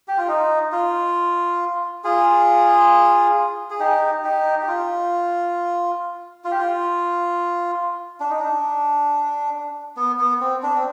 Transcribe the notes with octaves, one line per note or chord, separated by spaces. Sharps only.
G4
F4
D#4
F4
F4 G#4
G#4
D#4 G4
D#4 G4
G4
F4
F4
G4
F4
D4
D#4
D4
B3
B3
C4
D4
C4